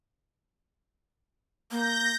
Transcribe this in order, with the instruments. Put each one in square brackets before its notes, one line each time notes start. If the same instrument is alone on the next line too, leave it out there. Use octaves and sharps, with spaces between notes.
[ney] A#3 [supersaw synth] G6 A#6